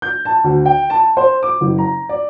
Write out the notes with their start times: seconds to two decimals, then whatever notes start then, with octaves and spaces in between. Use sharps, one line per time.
0.02 G6
0.25 A5
0.44 D2
0.66 G5
0.90 A5
1.17 C5
1.43 D6
1.61 F#1
1.78 A#5
2.09 D5